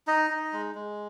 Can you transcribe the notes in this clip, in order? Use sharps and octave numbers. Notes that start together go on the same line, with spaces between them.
D#4 D#5
D#4
G#3
G#3